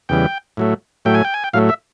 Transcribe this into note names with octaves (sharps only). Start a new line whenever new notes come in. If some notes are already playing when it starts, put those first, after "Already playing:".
E2 C#3 E3 G3 G5
A2 F#3 A3
A2 F#3 A3 G5
G#5
G5
G#5
G5
A2 F#3 A3 F5
E5